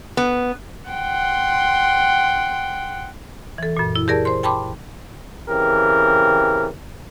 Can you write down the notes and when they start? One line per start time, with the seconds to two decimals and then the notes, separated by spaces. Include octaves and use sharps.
0.17 B3
0.89 F#5 G5 C6
3.58 E3 A4
3.77 F#2 A#2
3.96 E4
4.08 G4 G#4 A#4 D5 A5
4.25 C5 C6
4.43 G5 A5 B5 C6 D6
5.48 C#3 E3 C4 G4 A#4